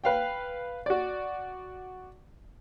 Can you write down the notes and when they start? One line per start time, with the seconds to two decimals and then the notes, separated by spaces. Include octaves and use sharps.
0.04 B4 F5 G5
0.86 F#4 D5